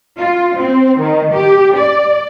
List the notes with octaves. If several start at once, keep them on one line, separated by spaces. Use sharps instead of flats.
F4
C4
D#3
G4
D5